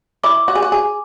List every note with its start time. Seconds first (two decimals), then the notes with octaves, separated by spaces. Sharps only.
0.24 E4 D6
0.48 F#4
0.55 G#4
0.63 F#4
0.72 G#4